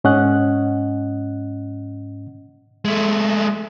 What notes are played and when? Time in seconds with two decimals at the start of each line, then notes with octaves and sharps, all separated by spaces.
0.04 G#2 C#4 D#5 F#5 F#6
2.85 G#3 A3